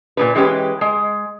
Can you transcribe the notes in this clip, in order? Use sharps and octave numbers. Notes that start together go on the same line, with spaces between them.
A#2 D#3 B4
E3 G#3 C#4 G4 B4
G#3